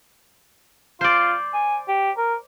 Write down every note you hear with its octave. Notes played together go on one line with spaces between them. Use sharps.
F4 C5 D5
G#5
G4
A#4